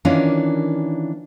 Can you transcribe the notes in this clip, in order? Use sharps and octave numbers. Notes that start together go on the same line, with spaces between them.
D#3 E3 A#3 C#4 D4 F4